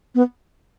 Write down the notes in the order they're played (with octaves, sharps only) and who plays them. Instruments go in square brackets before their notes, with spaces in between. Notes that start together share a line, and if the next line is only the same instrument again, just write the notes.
[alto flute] B3